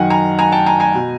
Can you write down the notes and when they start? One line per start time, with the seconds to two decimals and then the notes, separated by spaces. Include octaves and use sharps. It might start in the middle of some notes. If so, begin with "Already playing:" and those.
Already playing: F#2 D#3 F#5 G#5
0.10 G#5 A#5
0.39 G#5 A#5
0.52 G5 A5
0.66 G#5 A#5
0.80 G#5 A#5
0.95 B2